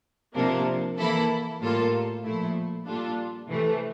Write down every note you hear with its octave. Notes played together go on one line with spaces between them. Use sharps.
C3 F3 A#3 D4
E3 A#3 E4 A4
A2 G3 A#3 F4 A4
A#2 F3 A3 E4
A#2 G3 D4 F4 A4
C3 E3 A3